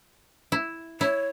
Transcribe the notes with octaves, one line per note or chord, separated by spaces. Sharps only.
E4
E4 C#5